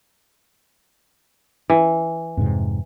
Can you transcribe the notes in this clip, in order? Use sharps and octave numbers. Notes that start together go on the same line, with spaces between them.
E3
F2 G#2 C3